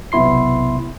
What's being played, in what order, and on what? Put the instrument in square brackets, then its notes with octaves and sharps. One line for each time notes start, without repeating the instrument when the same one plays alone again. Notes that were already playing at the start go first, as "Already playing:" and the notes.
[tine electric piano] B1 C3 B3 E4 C6 C7